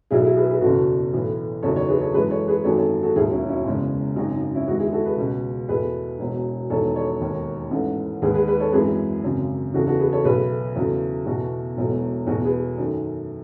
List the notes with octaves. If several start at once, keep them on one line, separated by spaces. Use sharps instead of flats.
B1 B2 F#3 A3 E4 G#4
E4 G#4
G#4 B4
G#4 B4
F#1 E2 B2 F#4 A4
B1 A2 E3
F#1 E2 D#3 F#3 A3 A4 C#5
A4 C#5
G#4 B4
A4 C#5
F#2 E3 G#3 G#4 B4
A4 C#5
G#4 B4
G#1 F#2 D#3 F#3 A3 A4 C#5
A4 C#5
F#4 A4
E1 D#2 D#3 F#3 E4 G#4
C#4 E4
C#4 E4
F#1 E2 C#3 G#3
G#1 F#2 C#3 D#4 F#4
D#4
D#4
C#4 E4
E2 D#3 G#3 D#4 F#4
E4 G#4
F#4 A4
G#4 B4
C#2 B2 G#3
E2 B2 A3 G#4 B4
E1 E2 B2
E1 E2 D#3 A3 A4 C#5
A4 C#5
E1 D#2 D#3
A1 G#2 E3 A3
D#2 D#3 G#3 G#4 B4
G#4 B4
G#4 B4
A4 C#5
G#1 F#2 E3 G#3 G#4 B4
G#1 F#2 C#3
E2 C#3 E3 F#4 A4
F#4 A4
G#4 B4
A4 C#5
B1 B2 F#3 A3 G#4 B4
E2 C#3 F#3 A3
E2 B2 A3 F#4 A4
E1 E2 B2 F#3 A3
E2 B2 A3 F#4 A4
G#4 B4
F#2 D#3 A3